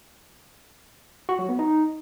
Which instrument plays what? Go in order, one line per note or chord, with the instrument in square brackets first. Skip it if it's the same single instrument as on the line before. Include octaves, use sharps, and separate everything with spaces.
[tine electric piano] F#4
F#3
B3
D#4